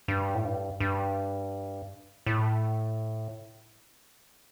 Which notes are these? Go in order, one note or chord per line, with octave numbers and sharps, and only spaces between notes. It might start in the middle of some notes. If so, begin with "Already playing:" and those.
G2
A2
G2
G2
A2